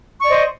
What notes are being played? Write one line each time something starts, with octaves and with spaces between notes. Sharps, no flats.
C5 D5 D#5 C#6